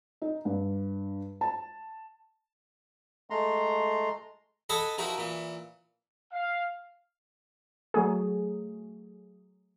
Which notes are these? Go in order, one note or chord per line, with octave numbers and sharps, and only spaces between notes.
D#4
G2
A5
G#3 A3 A#5 C6
A4 D#5 F#5 G#5 A5 B5
D#3 F3 D#4 E4 F#4
A#2 E3
F5
F#3 A3 G#4